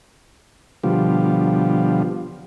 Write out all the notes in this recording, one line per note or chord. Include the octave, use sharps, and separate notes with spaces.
B2 D3 F3 G3